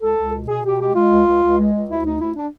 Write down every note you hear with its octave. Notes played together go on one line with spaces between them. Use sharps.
C#2 A4
C#2
B2
B2 G#4
B2 G4
G#3 G4
G#3 F4
C#2
C#2
C#2
G#3
C#2
D2 E4
D2 D#4
D2 E4
D4